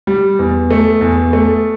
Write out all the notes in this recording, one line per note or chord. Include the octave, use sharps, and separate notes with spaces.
G3
E2
A3
E2
A3